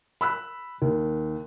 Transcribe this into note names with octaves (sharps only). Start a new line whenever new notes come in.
B5 E6 F#6
D#2